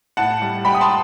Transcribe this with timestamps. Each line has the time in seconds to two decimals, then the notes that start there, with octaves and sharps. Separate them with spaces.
0.17 A2 F#5 A5
0.42 G3
0.65 G3 G5 B5
0.75 D#6
0.81 A5 C6